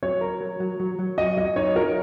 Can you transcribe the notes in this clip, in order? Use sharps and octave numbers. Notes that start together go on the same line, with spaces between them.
F#3 C#5
A#4
F#3
F#3
F#3
F#3
F#4 D#5
F#3 D#5
D#4 C#5
F#4 A#4